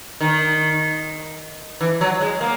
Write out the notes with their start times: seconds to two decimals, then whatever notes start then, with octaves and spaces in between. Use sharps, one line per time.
0.21 D#3
1.81 E3
2.01 F#3
2.21 G#3
2.41 A#3